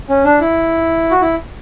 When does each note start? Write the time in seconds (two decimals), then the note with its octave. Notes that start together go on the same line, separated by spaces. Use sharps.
0.09 C#4
0.25 D4
0.41 E4
1.11 F#4
1.21 E4